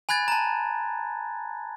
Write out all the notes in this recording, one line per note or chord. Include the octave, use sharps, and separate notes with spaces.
G#5 B5 F#6 G#6 A6
A5 A#5